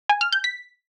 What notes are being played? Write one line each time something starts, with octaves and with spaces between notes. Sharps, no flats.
G#5
F6
G6
B6